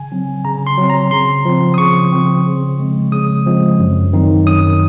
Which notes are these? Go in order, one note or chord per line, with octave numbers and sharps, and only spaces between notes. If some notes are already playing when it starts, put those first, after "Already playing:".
Already playing: C#3 G#5
F#3 C4
C#3 A#5
C6
F#3 C4
A#5
C#3 C6
F3 C4
D#6
C#3 C#6
F3 C4
C#3
F3 G#3 C4
C#3 D#6
F3 G#3 C4
F#2
D#3 F#3 C4 D#4
F#2 D#6